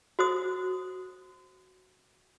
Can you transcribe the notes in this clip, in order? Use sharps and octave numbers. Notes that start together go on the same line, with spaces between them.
F#4 C5 D#6